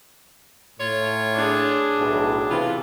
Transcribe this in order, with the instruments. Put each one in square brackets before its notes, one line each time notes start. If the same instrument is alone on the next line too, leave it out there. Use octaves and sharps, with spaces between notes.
[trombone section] A2 [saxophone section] F4 C#5
[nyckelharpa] D4 G#4
[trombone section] B1 A2
[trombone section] C3 E3 [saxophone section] B3 F4